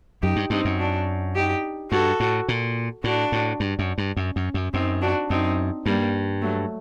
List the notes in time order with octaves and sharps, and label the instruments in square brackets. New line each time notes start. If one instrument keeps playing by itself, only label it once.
[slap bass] F#2 [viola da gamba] D#4 G4
[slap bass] G2
[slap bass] G2 [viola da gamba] C4 D#4
[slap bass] F#2
[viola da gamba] D4 F#4
D#4 G4
[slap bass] G2 [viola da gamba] F#4 A4
[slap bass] A2
A#2
[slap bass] A2 [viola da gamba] D4 F#4
[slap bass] A2
G2
F#2
G2
F#2
F#2
F#2
[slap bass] F#2 [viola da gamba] C4 D#4
[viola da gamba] D4 F#4
[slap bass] F#2 [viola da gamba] C4 D#4
[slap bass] G2 [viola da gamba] G3 A#3
[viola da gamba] F#3 A3